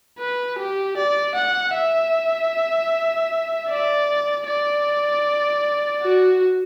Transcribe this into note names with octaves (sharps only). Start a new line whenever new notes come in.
B4
G4
D5
F#5
E5
D5
D5
F#4